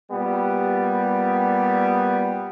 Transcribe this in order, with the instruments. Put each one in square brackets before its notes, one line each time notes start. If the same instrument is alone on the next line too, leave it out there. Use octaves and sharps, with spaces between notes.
[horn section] A#2 G3 B3